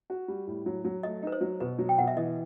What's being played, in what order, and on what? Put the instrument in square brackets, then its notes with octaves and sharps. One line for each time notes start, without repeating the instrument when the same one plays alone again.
[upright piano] F#4
G3
A2
F#3
F#3
[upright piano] A3 [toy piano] D#5
[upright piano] D#4 [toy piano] B4
[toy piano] C5
[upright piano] F#3
[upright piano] B2 [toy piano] B4
[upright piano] F#3
[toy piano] G5
[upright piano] B2 [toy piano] F#5
[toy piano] E5
[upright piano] E3 [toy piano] D#5